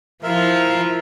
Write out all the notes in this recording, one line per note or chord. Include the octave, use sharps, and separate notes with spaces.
F3 E4 F4 A#4 E5